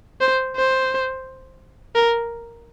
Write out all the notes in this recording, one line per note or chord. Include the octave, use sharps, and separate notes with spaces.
C5
C5
A#4